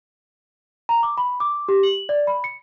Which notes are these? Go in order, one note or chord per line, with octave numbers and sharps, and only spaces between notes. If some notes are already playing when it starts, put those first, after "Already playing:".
A#5
D6
B5
D6
G4
F#7
D5
B5
C#7